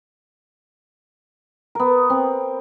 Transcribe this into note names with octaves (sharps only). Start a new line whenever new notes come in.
B3 A#4
C4